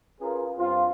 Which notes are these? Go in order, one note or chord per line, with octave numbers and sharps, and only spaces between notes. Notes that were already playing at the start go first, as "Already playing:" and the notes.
C#4 F4 G#4 A#4 B4
G2 C4 F4